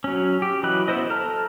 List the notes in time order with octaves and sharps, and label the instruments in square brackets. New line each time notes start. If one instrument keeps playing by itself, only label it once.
[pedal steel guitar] F#3 C#4
G4
E3 F#3 D#5 B5 F#6
B3 E4 C5 D#5
A4 A#5 F6